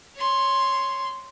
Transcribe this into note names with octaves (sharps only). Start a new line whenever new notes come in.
C#5 C6